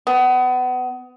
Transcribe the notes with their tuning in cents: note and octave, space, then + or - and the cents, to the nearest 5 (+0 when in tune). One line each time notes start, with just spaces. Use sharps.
B3 +30